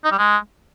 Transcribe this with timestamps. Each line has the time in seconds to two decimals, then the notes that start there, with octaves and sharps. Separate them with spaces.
0.05 D#4
0.12 G3
0.19 G#3